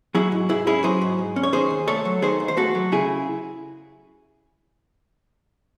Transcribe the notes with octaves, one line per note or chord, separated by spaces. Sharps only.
F#3 E4 G#4
G#2
G#2 E4 G#4
C#4 E4 G#4
F#3 G#4 C5
G#2
G#2
C#4
C#5
D#3 G#4 C5
D#2
A3 A4 C#5
F#3
D#3 G#4 C5
D#2
C5
A3 F#4 A4
F#3
C#3 E4 G#4